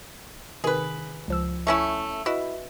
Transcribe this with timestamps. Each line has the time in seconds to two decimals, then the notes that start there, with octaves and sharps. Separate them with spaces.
0.64 C3 D#3 G#4 B4
1.28 C#2 F3 E6
1.67 A3 C#4 E4
2.26 E4 F#4 B4 D#5